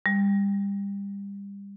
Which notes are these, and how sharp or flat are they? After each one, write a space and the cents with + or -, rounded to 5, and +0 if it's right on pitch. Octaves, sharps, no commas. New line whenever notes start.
G3 +30